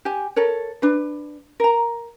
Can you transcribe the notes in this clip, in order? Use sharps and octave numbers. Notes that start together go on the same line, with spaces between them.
G4 G#5
A4 A#4 C#5
D4 B4
A#4 A#5